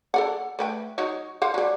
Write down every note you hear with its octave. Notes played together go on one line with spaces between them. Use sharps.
A4 D5 F#5
A3 B4 G5
F#3 D#4 C#5
C5 F5 F#5
F#3 G3